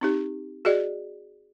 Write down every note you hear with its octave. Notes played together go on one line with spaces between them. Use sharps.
C4 D#4 G4
F#4 G#4 D5 D#5